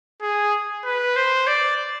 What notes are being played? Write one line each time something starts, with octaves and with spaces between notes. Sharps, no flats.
G#4
B4
C5
D5